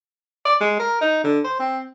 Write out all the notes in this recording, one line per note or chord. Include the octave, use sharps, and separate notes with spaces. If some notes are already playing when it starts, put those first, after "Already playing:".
D5
G#3
A#4
D#4
D3
C5
C4